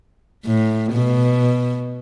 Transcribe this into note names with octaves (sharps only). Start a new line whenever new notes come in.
A2
B2